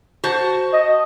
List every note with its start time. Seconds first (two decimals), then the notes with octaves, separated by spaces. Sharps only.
0.24 F#4 C5 A5
0.73 D#5